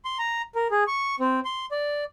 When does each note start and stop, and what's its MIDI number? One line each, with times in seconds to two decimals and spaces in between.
0.05 0.18 84
0.19 0.42 82
0.55 0.68 70
0.71 0.84 68
0.87 1.15 85
1.20 1.40 60
1.45 1.66 84
1.71 2.04 74